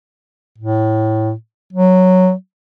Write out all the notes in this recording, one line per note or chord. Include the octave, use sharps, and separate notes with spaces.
A2
F#3